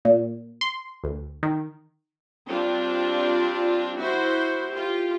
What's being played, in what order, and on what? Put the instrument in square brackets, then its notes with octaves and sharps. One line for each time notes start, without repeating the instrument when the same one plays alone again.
[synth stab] A#2
C6
D2
D#3
[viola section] G3 C4 D4 F4
E4 F#4 C5
F4 G4